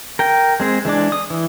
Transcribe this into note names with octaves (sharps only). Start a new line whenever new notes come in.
A#4 G5
G#3 C4 G#4
E3 G#3 D4 D6
D#6
E3